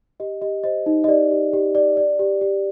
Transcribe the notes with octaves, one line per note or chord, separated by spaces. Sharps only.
G4 D#5
G4 D#5
C5 D#5
D#4
D#5
G4 D5
G4
G4
D5
D5
G4
G4